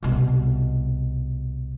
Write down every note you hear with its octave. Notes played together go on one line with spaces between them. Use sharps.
C2 B2